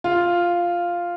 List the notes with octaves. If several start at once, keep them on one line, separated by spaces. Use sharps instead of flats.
F4